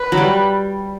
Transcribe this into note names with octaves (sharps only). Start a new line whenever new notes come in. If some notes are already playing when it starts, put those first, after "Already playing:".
Already playing: B4
F#3
G3